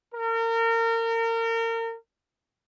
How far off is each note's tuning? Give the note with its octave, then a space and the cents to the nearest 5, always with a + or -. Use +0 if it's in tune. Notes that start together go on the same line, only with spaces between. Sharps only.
A#4 -30